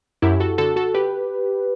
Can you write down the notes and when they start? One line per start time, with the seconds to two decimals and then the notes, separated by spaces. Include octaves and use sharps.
0.22 F#2 E4 G4
0.40 F#4 A4
0.58 D3 F#4 A4
0.76 F#4 A4
0.94 G4 B4